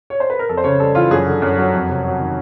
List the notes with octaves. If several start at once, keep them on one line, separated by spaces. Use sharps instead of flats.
C#5
C5
B4
A#4
F2 A4
C5
C#3 C#5
G3 A4
E3 F4
F#2 G#4
D3
F#2
F#3
F2
C3
F#3
D#3